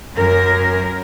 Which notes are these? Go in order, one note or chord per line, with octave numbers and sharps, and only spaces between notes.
F#2 A#4